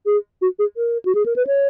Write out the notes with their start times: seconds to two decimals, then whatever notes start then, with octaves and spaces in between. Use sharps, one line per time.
0.06 G#4
0.42 F#4
0.59 G#4
0.77 A#4
1.05 F#4
1.15 G#4
1.26 A#4
1.36 B4
1.47 C#5